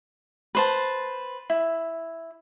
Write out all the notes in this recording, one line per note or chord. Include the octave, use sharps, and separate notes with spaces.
B4 C5 A5
E4